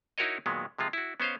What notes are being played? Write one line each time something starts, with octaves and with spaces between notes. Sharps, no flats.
D#4 E4 F#4 A#4 C#5 D#5
A#2 D#3 F#3 G#3 B3
C3 F3 G#3 F4
E4 F#4
B3 C#4 C5 D#5 F5